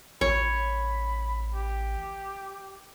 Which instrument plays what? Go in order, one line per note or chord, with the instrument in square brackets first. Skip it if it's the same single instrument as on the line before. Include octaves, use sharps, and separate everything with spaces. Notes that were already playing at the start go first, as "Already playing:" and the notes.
[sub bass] A1 [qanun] C#5 [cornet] B5
[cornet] G4